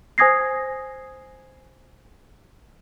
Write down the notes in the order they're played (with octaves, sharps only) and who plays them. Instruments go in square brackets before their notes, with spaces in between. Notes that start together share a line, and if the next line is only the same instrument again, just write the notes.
[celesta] C5 G#5 D#6 G#6 A#6 C7